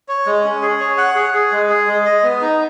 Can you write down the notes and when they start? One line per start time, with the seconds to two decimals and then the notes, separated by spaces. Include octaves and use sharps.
0.08 C#5
0.26 G#3
0.44 C#4
0.62 G#4
0.80 C#5
0.98 F#5
1.16 G#4
1.34 G#4
1.52 G#3
1.69 G#4
1.88 G#3
2.05 D#5
2.23 B3
2.41 D#4